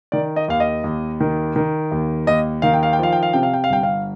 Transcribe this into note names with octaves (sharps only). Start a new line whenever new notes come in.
D#3 D5
D#5
D#2 F5
D#5
D#2
D#3
D#3
D#2
D#2 D#5
D#3 F5
G5
F5
G5
F3 F5
G5
F5
C3 G5
F5
G5
F5
G1 G5
F5